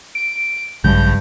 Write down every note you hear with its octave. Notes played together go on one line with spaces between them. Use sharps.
D7
A#1 G2 C#3 F#3 G#3 G6